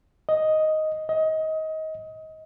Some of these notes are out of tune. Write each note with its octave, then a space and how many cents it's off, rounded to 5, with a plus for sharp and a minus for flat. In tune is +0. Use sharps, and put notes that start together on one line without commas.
D#5 +5
D#5 +25